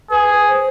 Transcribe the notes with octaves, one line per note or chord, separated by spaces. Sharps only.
G#4 B4
C5